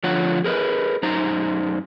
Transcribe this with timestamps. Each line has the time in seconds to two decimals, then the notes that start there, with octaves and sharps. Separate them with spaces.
0.04 D3 F3 F4 C#5 F#5
0.44 G#4 A#4 B4 D#5
1.03 F#2 D#4 C5 A#5